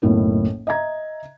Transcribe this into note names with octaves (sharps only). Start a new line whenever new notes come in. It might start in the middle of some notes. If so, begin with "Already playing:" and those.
F#1 B1 A2 E4 A#4
D#5 E5 A#5 G#6